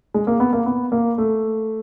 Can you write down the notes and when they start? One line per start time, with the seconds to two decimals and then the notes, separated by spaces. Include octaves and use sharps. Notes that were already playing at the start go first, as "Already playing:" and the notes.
0.14 G#3
0.27 A#3
0.40 B3
0.53 A#3
0.66 B3
0.92 A#3
1.18 A3